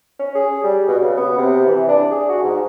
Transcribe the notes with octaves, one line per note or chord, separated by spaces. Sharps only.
C#4
G#4
G3
B2
C#3
B3
C3
E3
D4
G#4
F#4
G#2